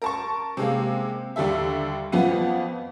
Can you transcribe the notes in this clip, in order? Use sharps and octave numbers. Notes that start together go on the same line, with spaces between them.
A#4 A5 C#6
C3 G#3 A#3
D#2 D3 G3 A4 E5
F2 F3 B3 F4 F#5 D#7